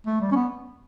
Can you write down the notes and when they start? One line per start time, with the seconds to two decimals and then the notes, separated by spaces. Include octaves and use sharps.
0.06 A3
0.21 G3
0.32 C#4
0.36 B3